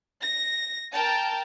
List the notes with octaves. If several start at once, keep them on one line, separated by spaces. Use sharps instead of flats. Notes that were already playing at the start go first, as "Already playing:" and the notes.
A#6
A#4 G5 A5